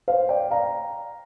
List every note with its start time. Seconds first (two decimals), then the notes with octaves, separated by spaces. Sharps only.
0.08 C5 F5
0.29 D5 G5
0.50 F5 A#5